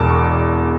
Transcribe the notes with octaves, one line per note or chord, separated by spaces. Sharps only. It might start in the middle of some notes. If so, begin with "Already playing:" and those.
Already playing: E1 E2 B2 A5 D6
C#6